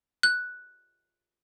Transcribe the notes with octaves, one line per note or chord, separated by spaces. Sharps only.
F#6